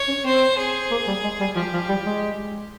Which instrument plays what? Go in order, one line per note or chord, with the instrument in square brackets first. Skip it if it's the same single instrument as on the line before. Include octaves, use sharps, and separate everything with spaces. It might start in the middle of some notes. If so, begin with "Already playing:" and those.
Already playing: [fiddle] C#5
[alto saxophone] C#4
[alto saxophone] C4 [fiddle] C5
[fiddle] G#4
[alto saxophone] A#3
G3
G#3
G3
[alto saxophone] F3 [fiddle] G4
[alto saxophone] F3
G3
G#3